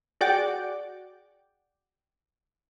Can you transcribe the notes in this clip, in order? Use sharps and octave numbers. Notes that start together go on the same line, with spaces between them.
F#4 G#4 D5 F#5 G5 D6